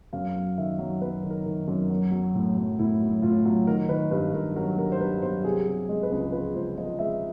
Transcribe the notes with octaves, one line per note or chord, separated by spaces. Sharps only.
F#2 F5
F#3
D#3 E5
F#3
F#3 B4
D#3
A#4
D#3
F#2
F#3
F#3
A2
F#3
A2 E4
F#3
A2 F4
F#3
D#3 A#4
D#3 B4
G2 B4
G2 A#4
F#3 A#4
G2 A#4
C5
G2 B4
F#3 C5
C3 G#4
C3
G#3
B4
C#2
F3 B4
C#2 C5
F3 D#5
G#3 E5